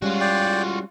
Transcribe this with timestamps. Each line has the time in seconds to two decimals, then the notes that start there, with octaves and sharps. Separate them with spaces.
0.02 G3 G#3 C#4 F4 F#4
0.21 D5 G5